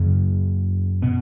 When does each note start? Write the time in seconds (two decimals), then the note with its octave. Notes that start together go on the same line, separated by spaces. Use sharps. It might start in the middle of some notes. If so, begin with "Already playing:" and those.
Already playing: F#2 C#3 A#3
1.02 B2 B3